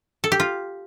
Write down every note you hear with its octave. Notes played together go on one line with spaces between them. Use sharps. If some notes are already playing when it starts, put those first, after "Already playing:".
A4
G4
F4